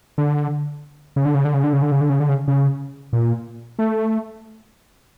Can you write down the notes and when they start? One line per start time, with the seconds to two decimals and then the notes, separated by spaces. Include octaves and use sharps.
0.18 D3
1.16 C#3
1.25 D3
1.35 C#3
1.45 D3
1.54 C#3
1.64 D3
1.73 C#3
1.82 D3
1.92 C#3
2.01 D3
2.10 C#3
2.20 D3
2.29 C#3
2.48 C#3
3.13 A#2
3.79 A3